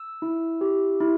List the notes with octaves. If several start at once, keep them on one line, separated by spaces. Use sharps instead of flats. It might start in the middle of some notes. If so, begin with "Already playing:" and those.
Already playing: E6
E4
G4
E4